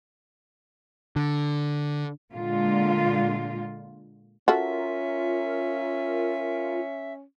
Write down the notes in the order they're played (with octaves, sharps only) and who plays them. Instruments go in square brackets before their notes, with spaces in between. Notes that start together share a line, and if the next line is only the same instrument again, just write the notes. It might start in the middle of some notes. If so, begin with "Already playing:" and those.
[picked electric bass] D3
[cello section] A#2 D3 G#3 F4
[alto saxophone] C#4 [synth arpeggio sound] F4 A#4 [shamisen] F#4 A4 [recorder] E5